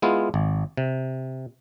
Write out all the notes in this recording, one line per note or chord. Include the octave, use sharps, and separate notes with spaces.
G#3 B3 E4 F4
G#1
C3